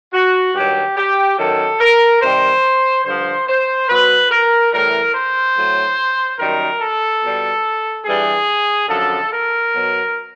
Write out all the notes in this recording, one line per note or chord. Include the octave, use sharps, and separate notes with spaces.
F#4
G2 D#3 F#3 G4
G4
F#2 D#3 F#3 A4
A#4
C3 D#3 G3 C5
G2 D3 F3 C5
C5
B2 F#3 B4
A#4
A2 E3 G3 A#4
C5
A2 F#3
F#2 D#3 G3 A#4
A4
B2 G3
G2 E3 G3 G#4
F#2 D3 F3 A4
A#4
B2 F#3